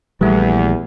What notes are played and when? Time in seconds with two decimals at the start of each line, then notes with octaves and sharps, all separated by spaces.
0.21 A#1 E2 E3 G3 A3